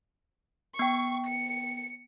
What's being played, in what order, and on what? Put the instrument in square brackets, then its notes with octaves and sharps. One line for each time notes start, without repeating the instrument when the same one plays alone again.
[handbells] B3 G5 [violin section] C#6
[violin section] C#7